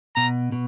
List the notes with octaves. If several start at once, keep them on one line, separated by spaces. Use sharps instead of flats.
B2 A#5
B2